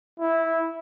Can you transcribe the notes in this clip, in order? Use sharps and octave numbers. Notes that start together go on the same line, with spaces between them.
E4